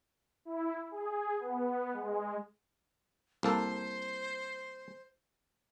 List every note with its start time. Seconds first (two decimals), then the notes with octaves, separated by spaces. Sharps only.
0.45 E4
0.91 G#4
1.39 B3
1.93 G#3
3.43 C2 A#3 A4 C5